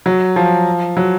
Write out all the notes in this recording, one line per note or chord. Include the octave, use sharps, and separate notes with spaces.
F#3
F3
F#3